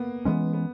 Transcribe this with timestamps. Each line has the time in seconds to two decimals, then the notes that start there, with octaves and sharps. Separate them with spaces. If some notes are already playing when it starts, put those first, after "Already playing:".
Already playing: A#3 B3
0.25 E3 G#3 B3 C#4
0.53 B3